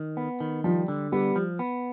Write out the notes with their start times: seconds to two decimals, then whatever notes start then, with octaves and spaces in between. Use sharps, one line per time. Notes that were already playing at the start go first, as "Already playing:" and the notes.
Already playing: D#3
0.17 B3
0.40 D#3
0.64 F3 G3
0.88 D3
1.12 G3 B3
1.36 F3
1.59 B3